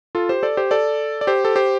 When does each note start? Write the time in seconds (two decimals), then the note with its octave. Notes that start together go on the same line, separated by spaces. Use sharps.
0.15 F4 A4
0.29 G4 C5
0.43 A4 D5
0.57 G4 C5
0.71 A4 D5
1.21 D5
1.27 G4 C5
1.45 A4
1.56 G4 C5